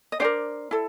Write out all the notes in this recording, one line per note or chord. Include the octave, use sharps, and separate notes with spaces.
D#5
D4 G4 A#4 C5 D5
E4 A4